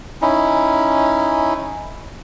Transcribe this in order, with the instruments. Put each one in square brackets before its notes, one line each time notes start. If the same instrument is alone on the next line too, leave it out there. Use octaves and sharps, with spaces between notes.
[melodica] C#4 D#4 E4